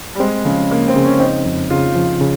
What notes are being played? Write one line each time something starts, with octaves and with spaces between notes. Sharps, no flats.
G3
G#3 C4
C#3 F3
C#3 A#3
C4
C#3
C#4
C4 D#4
F2
C#3 F4
F3
C#3